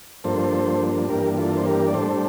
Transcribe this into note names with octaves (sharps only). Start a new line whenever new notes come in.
G2 F3 A#3 D4 A4 C5
G2 E3 A#3 D4 G4 A#4
F4 A4
C5
G4 A#4
D5
A2 G3 D4 A4 C5